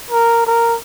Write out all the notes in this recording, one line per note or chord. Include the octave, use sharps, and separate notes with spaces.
A#4
A#4